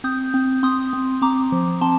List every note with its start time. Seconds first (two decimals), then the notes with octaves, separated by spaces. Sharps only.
0.04 C4 D#6 G6
0.34 C4
0.63 C4 C6 D#6
0.93 C4
1.22 C4 A#5 D6
1.52 F3
1.81 C4 A5 C6